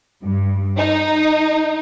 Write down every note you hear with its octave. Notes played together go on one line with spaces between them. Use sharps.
G2
D#4